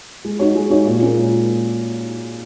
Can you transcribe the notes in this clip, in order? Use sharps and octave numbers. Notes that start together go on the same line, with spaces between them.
G#3
D#4 F#4 C#5
G#3
D#4 F#4 C#5
A#2
G#3 C#4 A#4
A#2